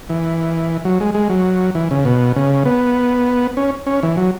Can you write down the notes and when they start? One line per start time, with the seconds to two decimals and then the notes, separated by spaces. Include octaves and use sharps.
0.09 E3
0.85 F#3
1.00 G#3
1.14 G#3
1.29 F#3
1.75 E3
1.91 C#3
2.05 B2
2.36 C#3
2.65 B3
3.57 C#4
3.86 C#4
4.03 E3
4.17 F#3